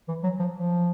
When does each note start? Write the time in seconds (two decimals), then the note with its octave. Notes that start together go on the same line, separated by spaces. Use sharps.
0.08 E3
0.23 F#3
0.39 F3
0.55 F3